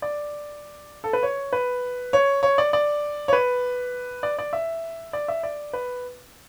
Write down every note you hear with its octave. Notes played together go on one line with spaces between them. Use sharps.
D5
A4
B4
C#5
B4
C#5
C#5
D5
D5
C#5
B4
D5
D5
E5
D5
E5
D5
B4